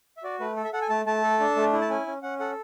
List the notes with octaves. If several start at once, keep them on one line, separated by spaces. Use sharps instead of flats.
E5
F#4 D5
A3 B4
A4
E5
A4 F#5
G#5
A3 A5
A3 A5
A4
D4
A3
E4
A5
C#4 G#5
C#4
C#4 F#5
A4 F#5